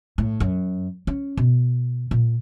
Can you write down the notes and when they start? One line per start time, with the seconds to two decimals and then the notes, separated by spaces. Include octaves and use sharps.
0.18 A2
0.40 F#2
1.07 C#4
1.37 B2
2.11 A#2